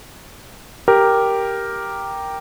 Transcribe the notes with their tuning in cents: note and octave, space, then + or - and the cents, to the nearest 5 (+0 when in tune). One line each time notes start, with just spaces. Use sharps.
G4 +0 A#4 +0